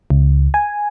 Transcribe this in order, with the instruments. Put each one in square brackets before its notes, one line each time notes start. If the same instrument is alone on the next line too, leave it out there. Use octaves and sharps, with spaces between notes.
[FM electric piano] C#2
G#5